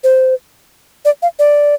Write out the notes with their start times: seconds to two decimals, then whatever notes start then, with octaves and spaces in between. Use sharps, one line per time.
0.04 C5
1.05 D5
1.22 F5
1.39 D5